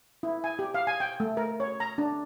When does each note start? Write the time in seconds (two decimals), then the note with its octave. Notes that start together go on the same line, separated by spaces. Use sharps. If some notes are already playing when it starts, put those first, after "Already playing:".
0.23 E4
0.44 G#5
0.59 G4
0.74 F5
0.87 G#5
1.00 G5
1.20 A3
1.37 A#4
1.60 C#5
1.80 A#5
1.98 D4